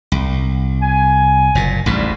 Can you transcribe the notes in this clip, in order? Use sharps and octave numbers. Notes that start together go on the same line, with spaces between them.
C2
G#5
F#1 A#2
A1 D2 G#2 G3